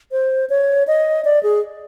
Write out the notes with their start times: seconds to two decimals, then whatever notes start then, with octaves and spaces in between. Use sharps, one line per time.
0.12 C5
0.50 C#5
0.87 D#5
1.25 D5
1.43 G#4